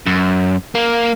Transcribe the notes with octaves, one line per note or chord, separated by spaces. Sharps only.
F#2
A#3